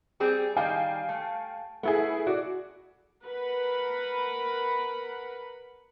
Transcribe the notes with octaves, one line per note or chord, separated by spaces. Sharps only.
G3 C4 G#4
D#3 G3 F5 G5 G#5
A3
A3 B3 E4 G#4
F#4 D5
A#4 B4 F#5 B5